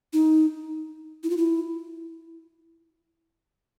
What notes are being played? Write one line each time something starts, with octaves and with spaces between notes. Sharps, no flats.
D#4
E4
F4
E4